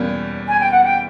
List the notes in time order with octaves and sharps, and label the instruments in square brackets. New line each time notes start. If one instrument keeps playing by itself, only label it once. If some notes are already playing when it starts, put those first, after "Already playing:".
Already playing: [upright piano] E2 B2 G3 A#3 C#4
[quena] G#5
G5
F#5
G5